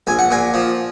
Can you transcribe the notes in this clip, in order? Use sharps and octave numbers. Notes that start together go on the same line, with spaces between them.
A#1 G#5
F#5
A#2 G#5
F3